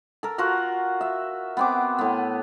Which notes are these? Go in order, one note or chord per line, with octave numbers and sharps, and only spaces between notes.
A4 A#4
F4 F#4 A#4 F#5
E5
B3 C4 D6
A2 B3